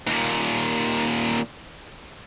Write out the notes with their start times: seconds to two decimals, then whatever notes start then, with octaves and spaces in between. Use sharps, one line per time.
0.07 D#2 A#2